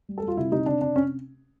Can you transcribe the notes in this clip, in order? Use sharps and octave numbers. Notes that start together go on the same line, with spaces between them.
G3
A4
G3
F4
C3 E4
C3 D#4
C3 D4
C3 D4
C#4